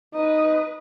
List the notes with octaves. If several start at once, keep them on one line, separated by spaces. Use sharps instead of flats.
D#4 B4 D#5